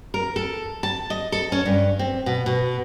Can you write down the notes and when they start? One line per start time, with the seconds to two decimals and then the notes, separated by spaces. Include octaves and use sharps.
0.14 A#4
0.36 A4
0.83 A5
1.10 D#5
1.32 A4
1.52 C#4
1.66 G2
1.99 C4
2.26 B2
2.46 B2